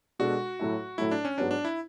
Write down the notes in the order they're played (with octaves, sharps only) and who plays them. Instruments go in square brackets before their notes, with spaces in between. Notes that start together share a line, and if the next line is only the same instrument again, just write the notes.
[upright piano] B2 G#3 D4 A4 [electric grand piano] F#4
[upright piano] A2 F#3 A3 E4
[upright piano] A2 F#3 A3 [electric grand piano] E4
[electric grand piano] D4
C#4
[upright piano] G#2 F#3 B3 F#4 C#5 [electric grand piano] D4
[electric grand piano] D4
E4